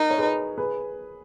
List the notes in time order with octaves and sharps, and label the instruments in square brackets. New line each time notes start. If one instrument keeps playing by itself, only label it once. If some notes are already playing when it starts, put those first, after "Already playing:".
Already playing: [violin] D#4 [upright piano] A#4
[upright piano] C#5
G#4 B4
G#4 B4